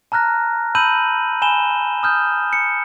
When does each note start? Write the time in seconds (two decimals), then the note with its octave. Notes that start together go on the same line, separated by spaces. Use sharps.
0.12 A5 A#5 F6 F#6 A#6
0.75 A5 B5 E6 G6 D#7 F#7
1.42 G#5 B5 E7 G7
2.03 D#6 F6 G6
2.53 C#7